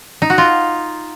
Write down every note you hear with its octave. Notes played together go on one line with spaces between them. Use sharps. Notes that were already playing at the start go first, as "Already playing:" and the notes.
D#4
F#4
F4